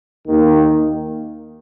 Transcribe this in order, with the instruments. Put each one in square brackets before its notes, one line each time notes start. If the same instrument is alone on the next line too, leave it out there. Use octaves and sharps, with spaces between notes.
[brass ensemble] D#2 D#3 A#3